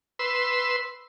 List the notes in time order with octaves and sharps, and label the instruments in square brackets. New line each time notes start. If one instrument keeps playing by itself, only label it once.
[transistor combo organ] B4 C6 E6